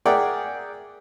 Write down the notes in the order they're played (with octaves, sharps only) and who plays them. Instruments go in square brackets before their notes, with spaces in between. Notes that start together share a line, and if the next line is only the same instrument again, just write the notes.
[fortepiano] G#4 A#4 D5 E5 F#5 G5